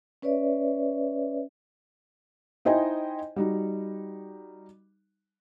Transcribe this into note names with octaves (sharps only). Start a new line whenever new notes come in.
C#4 B4 C#5 D5 E5
D#4 E4 C5 D#5 G5 G#5
G3 D#4 F#4